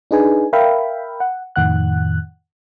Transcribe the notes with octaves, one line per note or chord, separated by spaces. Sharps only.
D4 D#4 G#4 B4 G#5
A#4 E5 F5 G5 B5
F#5
F2 A2 D#3 F#5 F#6